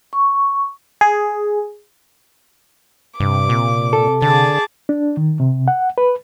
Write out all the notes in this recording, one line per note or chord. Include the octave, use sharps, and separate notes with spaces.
C#6
G#4
G2 C3 D6
A#2
A4
D3 G#4 A5 D6
D4
D#3
C3
F#5
B4